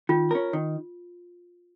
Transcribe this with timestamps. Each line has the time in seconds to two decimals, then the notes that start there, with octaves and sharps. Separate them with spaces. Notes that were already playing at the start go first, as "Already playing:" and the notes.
0.09 D#3 F4
0.31 C#4 A#4
0.53 D#3